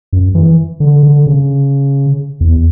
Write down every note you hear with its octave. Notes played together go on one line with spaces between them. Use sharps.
F#2
E3
D3
D3
C#3
E2